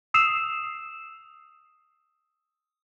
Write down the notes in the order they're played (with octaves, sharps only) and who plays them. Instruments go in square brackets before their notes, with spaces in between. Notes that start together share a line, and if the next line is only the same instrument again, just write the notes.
[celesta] D#6 E6 C7 E7 F7